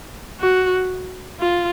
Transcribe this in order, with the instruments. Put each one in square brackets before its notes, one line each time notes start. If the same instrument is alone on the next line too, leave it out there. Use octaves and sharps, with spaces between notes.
[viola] F#4
F4